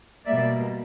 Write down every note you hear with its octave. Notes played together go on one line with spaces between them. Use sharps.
B2 G3 A#3 D5 E5